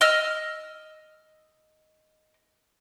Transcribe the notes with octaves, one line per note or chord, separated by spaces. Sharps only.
D#5 E6 F6